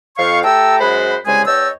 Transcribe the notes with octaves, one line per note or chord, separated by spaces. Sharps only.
F2 F5 C#6
A3 G4 G5 A5 A#5 E6
F#2 G#3 C5 F#5 B5
C2 C#3 G#3 G#4 G#5
E2 C#5 D#5 G5 A5 E6